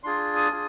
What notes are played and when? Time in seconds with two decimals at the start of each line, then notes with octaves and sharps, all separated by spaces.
0.03 D4 F4 G#4 C6
0.36 D#6
0.52 D4 F4 G#4